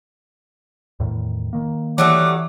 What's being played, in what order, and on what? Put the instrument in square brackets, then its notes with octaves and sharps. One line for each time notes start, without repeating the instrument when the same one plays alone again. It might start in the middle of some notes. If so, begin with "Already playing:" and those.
[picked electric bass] E2 A2 D#3
D#3 A#3
[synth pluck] E3 [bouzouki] F#3 G3 A3 [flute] D6